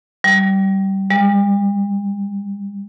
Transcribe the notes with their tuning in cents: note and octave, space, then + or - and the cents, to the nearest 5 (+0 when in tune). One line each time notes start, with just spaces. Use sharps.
G3 -20
G3 +45